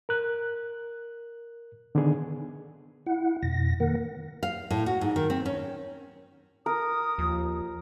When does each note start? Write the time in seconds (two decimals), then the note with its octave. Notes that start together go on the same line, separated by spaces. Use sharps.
0.09 A#4 F#6
1.95 D3 D#3 B3 D4 G#4
3.06 E4 F#5
3.43 F2 B2 A#6
3.80 D#3 A#3 A#4 F#5
4.43 F5
4.70 A2
4.86 F#4
5.01 G#2
5.16 D#3
5.30 C4
5.45 C#4
6.66 A#4 D#6
7.18 D#2 F3